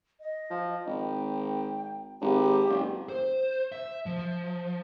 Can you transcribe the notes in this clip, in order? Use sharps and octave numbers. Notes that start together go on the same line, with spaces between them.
D#5
F3
G#1 G5
G#1 G4
F#1
C5
E5
F3